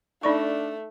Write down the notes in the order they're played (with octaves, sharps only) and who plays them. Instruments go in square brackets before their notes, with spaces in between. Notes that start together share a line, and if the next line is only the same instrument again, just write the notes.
[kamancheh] A3 [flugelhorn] D4 [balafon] D#4 D5 C#6